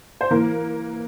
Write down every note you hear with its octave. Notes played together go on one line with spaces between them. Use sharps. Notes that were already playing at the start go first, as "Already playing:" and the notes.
C5
E3 A#3 A#4